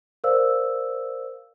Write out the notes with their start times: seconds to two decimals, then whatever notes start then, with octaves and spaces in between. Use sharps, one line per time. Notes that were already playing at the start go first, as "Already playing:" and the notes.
0.24 A#4 C5 D5 F5 E6